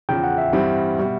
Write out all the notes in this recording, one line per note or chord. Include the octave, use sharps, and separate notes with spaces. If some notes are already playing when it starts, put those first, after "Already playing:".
E2 C#3 F3 G5
F#5
E5
G2 E3 G3 C4
B2 G3